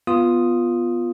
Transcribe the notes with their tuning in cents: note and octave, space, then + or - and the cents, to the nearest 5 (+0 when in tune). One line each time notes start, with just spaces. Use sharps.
B3 +0 F4 +0 D#6 +0